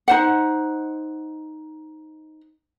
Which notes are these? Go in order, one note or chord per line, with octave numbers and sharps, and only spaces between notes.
D#4 C5 F#5